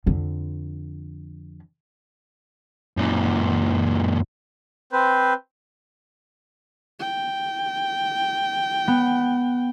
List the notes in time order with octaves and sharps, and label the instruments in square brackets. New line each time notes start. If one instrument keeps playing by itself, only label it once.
[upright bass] F2 D3
[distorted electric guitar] F#2 A#2
[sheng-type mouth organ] C4 B4 C5
[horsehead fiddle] G5
[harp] B3